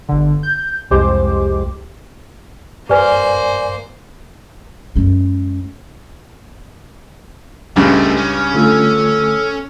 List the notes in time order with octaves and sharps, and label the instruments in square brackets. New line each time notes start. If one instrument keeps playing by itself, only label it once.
[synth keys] G1 D3
G6
C2 F2 G#3 G4 C5 D6
[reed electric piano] G2 D5 G#5 [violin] A#3 C5 [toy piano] G4 B4
[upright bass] F#2 G#3
[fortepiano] C#2 G2 C#3 [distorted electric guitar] G#3 A3
[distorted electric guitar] C#4
[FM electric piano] D3 A3 F4 [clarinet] A4